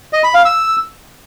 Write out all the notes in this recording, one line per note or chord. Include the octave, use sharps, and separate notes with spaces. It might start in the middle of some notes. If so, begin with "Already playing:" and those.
D#5
B5
F5
E6